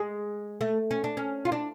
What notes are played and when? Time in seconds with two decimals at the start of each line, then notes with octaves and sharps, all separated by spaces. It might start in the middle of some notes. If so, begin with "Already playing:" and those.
Already playing: G#3
0.61 A3
0.91 C#4
1.04 D4
1.17 C#4
1.45 F4
1.52 D4